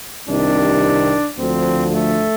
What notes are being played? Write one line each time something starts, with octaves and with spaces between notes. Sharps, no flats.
C2 C3 D#3 D4
D2 D3 F3 C4
A3